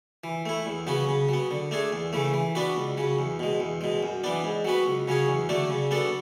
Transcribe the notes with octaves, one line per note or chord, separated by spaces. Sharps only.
E3
A3 E4
E2
C#3 F#3 B3 F#4
C#3
F#3 B3
D3
A3 D4 G#4
E2
C#3 E3 A3
E3
B3 D4 F#4 B4
C#2
C#3 F#3
E2
B2 G#3
E2
B2 G#3
F#2
E3 B3 D4
G#2
F#3 B3 F#4 B4
C#2
C#3 F#3 C#4 G#4
E2
D3 F#3 A3 D4
C#3
F#3 B3 D4 A4